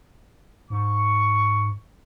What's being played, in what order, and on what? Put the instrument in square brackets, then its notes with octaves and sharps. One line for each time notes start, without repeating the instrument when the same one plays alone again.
[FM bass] G#2 [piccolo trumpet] C#6